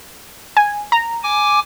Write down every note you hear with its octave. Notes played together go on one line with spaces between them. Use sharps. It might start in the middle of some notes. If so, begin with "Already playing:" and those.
G#5
A#5
G#5 D6